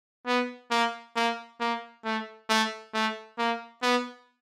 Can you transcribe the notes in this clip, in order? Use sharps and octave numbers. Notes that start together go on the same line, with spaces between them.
B3
A#3
A#3
A#3
A3
A3
A3
A#3
B3